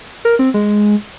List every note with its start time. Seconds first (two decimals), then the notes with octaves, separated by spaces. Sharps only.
0.25 A#4
0.39 C4
0.54 G#3